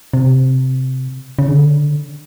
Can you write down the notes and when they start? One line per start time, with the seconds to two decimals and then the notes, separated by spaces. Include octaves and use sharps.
0.14 C3
1.39 C#3
1.48 D3